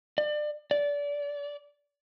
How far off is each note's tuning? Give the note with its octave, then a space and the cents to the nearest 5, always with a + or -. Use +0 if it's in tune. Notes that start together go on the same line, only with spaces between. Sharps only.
D5 +30
D5 -25